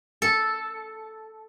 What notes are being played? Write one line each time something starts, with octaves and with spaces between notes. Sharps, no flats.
A4